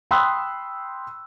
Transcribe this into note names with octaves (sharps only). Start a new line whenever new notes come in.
G5 B5 C6 D#6 E6 F#6